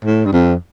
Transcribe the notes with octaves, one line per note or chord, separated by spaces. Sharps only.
A2
G2
F2